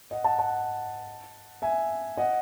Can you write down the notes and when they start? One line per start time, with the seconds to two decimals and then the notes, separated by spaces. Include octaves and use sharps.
0.11 D#5 F#5
0.24 F#5 A5
0.39 F#5 A5
1.62 E5 G#5
2.17 D#5 F#5